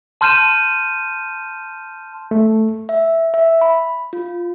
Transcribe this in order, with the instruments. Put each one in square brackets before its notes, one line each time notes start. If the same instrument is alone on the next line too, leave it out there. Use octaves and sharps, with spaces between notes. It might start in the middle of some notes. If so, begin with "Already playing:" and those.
[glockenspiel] A5 C6 F6 G6 D#7 E7
[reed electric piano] A3
[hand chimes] E5
E5
B5
F4